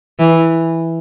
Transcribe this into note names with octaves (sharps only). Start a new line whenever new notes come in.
E3